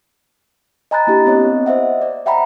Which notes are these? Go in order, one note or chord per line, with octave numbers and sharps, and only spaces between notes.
D#5 G#5 A#5 B5 F#6 A6
A#3 D4 E4 G4
B3 C4 C#5 D#5
C5 D#5 E5 F#5
D5
E5 F#5 G5 A#5 B5